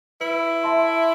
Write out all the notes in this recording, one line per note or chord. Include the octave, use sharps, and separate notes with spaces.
E4 B4
E5 A5 C6